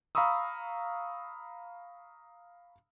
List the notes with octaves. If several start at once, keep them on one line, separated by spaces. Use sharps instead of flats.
F5 A#5 B5 C#6 D#6 E6